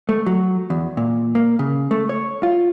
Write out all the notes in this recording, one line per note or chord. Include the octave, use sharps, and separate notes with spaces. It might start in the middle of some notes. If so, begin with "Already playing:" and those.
A3
F#3
E2
A#2
A#3
C#3
A3
C#5
F4